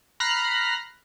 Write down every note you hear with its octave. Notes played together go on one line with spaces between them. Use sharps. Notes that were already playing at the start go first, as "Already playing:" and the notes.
A#5 B5 F6 F#6 A#6 C7